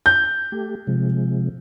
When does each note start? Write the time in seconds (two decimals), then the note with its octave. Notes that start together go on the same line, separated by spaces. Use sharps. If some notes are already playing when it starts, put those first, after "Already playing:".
0.06 G6
0.52 A3 G4
0.87 C3 F3 G#3